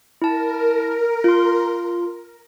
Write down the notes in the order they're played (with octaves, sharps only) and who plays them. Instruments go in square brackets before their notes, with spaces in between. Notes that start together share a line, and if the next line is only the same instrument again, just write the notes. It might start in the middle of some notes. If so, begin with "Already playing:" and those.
[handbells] E4 A5 [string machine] A#4
[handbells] F4 C6